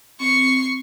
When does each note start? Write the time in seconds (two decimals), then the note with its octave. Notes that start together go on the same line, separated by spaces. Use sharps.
0.20 C4 C#6 C7